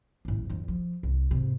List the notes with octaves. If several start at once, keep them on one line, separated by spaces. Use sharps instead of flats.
A1 F#2
F2 D3
F3
C2
G#2 C3